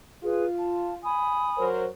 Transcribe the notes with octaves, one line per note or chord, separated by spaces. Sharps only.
F4 G#4 B4
A5
G#5 B5 D#6
F#3 A#4 C5